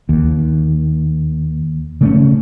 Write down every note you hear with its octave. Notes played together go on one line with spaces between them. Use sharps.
D#2
C#3 A3 C#4